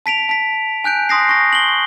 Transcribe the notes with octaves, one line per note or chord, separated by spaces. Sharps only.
A5 B6 D7 F7
A5 B6
G#5 F#6 G6 D7
C6 D#6 A#6 C7
C#6 A#6
F#7 G7